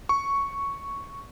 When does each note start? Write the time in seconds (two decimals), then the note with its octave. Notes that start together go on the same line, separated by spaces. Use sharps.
0.09 C#6